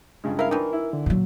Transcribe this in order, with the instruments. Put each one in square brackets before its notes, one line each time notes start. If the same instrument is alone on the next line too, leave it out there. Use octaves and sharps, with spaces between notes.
[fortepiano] G2 C#3 G#3
[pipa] E4 F5 [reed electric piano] A#4
[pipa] D#3 E3 [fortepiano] D4
[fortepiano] E4
[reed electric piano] D3
[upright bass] A#2 F#3